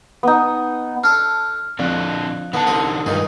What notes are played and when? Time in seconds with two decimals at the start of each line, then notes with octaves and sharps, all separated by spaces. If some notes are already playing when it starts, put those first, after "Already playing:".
0.23 B3 D#4
1.04 D4 A4 F6
1.79 F2 D3 C4 D4 D5 F#6
2.53 D3 B3 D#4 A5
2.67 C2 C4 D#6
3.06 C#2 G2 D#3 D#4 G#4